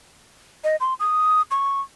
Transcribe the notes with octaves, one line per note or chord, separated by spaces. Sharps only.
D#5
C6
D#6
C#6